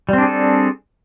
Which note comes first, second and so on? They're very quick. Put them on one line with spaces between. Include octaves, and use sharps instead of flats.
G3 C4 D4 G#4 A4